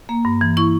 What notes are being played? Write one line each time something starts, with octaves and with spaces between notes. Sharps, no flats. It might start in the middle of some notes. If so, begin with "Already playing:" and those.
A#3
G2
E3
E4 C#6